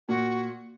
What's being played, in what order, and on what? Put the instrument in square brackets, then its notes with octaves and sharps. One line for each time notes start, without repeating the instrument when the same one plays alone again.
[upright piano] A#2 [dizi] F#4